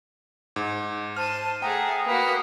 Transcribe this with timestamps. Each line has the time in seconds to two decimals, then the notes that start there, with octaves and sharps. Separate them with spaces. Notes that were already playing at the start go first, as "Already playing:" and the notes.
0.56 G#2
1.16 C5 A5 F6 D#7
1.62 A3 G#4 F#5 G5 A#5 D#6
2.06 A#3 F#4 B4 D#6